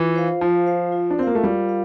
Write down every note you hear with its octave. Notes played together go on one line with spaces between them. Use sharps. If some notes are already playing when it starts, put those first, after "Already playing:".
Already playing: E3 F4
C5 F5
F3 F4
C5 F5
F4
D4
A#3 C4 A#4 F5
A3
G3 F4
F5